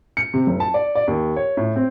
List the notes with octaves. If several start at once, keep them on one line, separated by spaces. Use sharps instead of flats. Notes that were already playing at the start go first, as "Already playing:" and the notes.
C#7
C3
F#1
A5
D5
D5
D#2
C#5
A2
C4